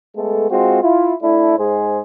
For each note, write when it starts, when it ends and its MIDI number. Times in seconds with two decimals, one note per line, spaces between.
0.16 0.50 56
0.16 0.50 57
0.16 0.50 59
0.16 0.50 69
0.50 0.80 56
0.50 0.80 60
0.50 0.80 65
0.50 0.80 66
0.82 1.14 64
0.82 1.14 65
1.22 1.58 57
1.22 1.58 62
1.22 1.58 64
1.58 2.02 44
1.58 2.02 56
1.58 2.02 68
1.58 2.02 72